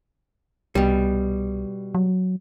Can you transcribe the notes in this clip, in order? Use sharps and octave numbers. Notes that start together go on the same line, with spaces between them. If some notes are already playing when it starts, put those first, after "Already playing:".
C2 B2 G3
F#3